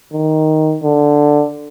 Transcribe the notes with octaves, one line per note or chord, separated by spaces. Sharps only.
D#3
D3